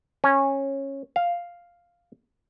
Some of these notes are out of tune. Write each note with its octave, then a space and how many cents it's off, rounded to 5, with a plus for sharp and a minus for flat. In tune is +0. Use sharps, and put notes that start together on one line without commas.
C#4 -15
F5 +0